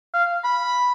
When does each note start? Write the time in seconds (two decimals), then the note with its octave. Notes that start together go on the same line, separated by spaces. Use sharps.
0.14 F5
0.44 B5